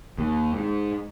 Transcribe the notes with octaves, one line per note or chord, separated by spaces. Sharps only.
D#2
G#2